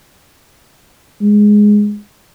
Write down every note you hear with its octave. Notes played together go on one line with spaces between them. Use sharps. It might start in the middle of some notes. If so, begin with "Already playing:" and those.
G#3